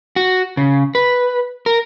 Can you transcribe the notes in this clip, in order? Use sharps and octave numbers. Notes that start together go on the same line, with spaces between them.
F#4
C#3
B4
A#4